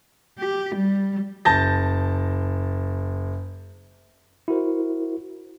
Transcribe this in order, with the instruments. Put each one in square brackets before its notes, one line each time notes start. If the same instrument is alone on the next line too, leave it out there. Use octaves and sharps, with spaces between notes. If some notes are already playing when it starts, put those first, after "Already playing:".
[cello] G4
G3
[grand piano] F#1 A5 G6 A6 A#6
[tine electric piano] E4 F#4 A#4 C5